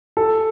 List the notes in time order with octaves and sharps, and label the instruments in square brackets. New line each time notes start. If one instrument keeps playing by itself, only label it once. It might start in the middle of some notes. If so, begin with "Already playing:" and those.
[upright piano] A4